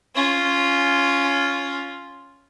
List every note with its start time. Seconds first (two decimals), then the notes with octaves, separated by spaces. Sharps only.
0.15 C#4 F4